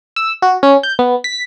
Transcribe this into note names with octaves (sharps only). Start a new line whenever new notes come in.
E6
F#4
C#4
G6
B3
B6